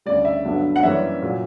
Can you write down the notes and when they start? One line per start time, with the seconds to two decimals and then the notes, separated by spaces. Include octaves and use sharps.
0.06 D2 C#3 G3 D5
0.25 E5
0.45 G2 D3 F#3 B3 D4
0.76 F#5
0.83 F#2 E3 G3 A#3 C#4 E5
1.22 A#2 F#3